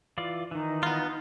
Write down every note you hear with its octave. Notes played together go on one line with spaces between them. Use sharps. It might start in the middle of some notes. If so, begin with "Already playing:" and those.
E3 F4 D5
D#3 E3 D#4
B3 F4